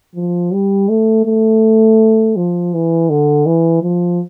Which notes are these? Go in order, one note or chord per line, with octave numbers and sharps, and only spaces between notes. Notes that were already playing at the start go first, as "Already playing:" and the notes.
F3
G3
A3
A3
F3
E3
D3
E3
F3